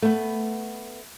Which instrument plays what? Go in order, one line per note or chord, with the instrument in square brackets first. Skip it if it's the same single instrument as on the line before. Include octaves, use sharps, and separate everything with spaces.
[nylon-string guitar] A3 B3